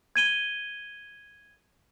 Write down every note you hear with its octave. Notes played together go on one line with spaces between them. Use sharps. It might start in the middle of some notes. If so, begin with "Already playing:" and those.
G#6 D#7 G7